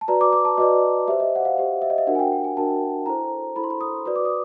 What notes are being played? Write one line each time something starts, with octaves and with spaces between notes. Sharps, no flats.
A5
F#4 B4 D5 A#5
D6
D6
A5
F#4 B4 D5 D#5
G4 C5 E5
D#5
F#5
F5
G4 C5
E5
D#5
E5
D4 F#4 A#4 F#5
G#5
G5
G5
G#5
D4 F#4 A#4 A5
E4 A4 C5 A#5
E4 A4 C5 B5
C6
B5
D#6
F#4 B4 D5 D#6
D6
D#6